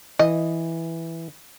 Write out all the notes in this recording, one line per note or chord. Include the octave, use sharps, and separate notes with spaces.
E3 D#5